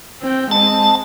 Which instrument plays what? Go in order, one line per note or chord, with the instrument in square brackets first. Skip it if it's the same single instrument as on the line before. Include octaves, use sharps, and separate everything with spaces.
[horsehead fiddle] C4 G5
[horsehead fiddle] G#3 C4 [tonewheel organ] A5